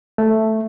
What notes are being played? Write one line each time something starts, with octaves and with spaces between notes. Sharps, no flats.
A3